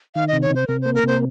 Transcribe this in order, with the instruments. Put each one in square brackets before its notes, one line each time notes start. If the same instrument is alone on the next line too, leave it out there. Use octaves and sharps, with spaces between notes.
[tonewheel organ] D#3 [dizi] F5
[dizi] D#5
[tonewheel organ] C3
[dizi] C#5
[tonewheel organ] C3 [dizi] C5
[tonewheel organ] C3 [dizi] A#4
[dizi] C5
[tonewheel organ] A#3
[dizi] A#4
[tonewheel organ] C3 [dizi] C5